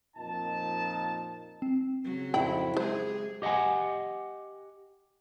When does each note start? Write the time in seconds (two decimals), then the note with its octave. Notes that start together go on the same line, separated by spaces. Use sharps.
0.17 F2 A#2 D#4 A5
1.62 C4
2.04 C#3 F#3
2.34 F2 E4 G5 B5
2.77 G#3 G4 G#4 C5
3.42 G4 D#5 F5 F#5 G#5